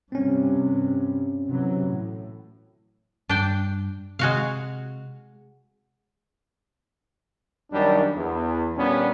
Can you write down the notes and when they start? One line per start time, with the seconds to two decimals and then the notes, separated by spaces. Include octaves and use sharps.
0.12 G2 C3 C4 C#4
1.48 C3 E3 F#3
1.87 A2
3.29 G2 D4 G5
4.19 C3 G#3 F#4 F5
7.73 F#2 D#3 G3 D4
8.15 E2
8.76 A#2 G3 B3 C#4 D4